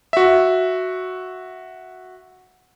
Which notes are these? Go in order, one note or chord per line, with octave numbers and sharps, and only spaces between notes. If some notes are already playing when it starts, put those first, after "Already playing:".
F#4 E5